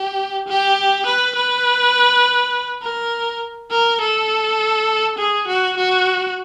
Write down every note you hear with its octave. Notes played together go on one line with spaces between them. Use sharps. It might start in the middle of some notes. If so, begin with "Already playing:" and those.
Already playing: G4
G4
B4
B4
A#4
A#4
A4
G#4
F#4
F#4